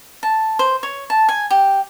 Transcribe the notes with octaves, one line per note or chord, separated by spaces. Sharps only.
A5
C5
C#5
A5
G#5
G4